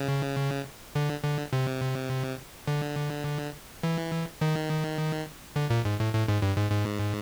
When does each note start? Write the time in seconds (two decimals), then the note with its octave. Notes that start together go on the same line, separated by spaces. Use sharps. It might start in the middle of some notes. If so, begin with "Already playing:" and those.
Already playing: C#3
0.95 D3
1.24 D3
1.53 C3
2.68 D3
3.83 E3
4.41 D#3
5.56 D3
5.70 A#2
5.85 G#2
6.00 A2
6.14 A2
6.28 G#2
6.42 G2
6.57 G#2
6.71 G#2